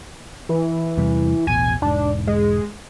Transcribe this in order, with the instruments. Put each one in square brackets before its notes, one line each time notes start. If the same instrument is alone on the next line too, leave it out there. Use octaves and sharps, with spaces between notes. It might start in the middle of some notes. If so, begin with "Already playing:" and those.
[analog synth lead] E3
[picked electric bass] E2 C3 G3
[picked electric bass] D#1 A1 B2 [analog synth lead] G#5
[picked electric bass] E1 G#2 [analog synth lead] D4
[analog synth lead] G#3